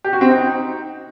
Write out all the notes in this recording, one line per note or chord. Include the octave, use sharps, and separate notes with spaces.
G4
F#4
C4
D#4